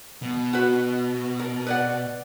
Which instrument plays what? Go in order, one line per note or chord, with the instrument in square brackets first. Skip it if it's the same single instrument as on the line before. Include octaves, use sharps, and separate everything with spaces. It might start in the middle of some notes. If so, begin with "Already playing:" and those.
[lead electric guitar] B2
[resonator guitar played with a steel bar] F#4 B4
A#4
B4 D5 F#5